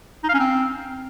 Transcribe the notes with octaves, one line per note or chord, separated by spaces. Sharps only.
D#4
F5
C#4
C4